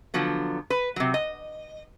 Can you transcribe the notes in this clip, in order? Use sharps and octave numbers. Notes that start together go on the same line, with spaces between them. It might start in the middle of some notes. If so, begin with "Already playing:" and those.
D3 F3 F#3 B3
B4
C3 F#3
D#5